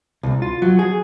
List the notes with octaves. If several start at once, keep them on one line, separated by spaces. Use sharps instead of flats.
C2
F4
F#3
G#4